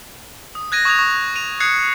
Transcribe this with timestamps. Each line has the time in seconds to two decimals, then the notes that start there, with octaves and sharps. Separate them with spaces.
0.55 D#6
0.72 F#6 G#6 A#6 D#7
0.85 C#6 D#6 F#6 G#6 F7
0.99 C#6
1.36 D#7 F7
1.60 D#6 F#6 G#6 C7 C#7